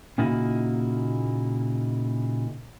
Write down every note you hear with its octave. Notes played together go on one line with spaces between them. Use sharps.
A#2 C#3 A#3 D#4 E4 F#4